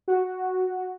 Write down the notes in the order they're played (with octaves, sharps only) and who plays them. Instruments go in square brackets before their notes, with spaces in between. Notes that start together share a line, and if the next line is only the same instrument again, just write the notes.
[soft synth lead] F#4